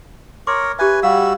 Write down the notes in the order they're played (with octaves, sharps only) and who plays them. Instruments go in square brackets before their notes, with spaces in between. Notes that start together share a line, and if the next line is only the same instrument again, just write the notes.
[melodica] A#4 C#5 [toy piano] C6 D6
[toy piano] G4 E5 [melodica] B4 G#5
[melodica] G3 F#4 E6 [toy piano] F5